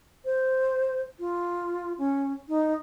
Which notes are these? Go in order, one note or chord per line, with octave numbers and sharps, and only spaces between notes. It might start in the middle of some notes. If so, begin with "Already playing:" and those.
C5
F4
C#4
D#4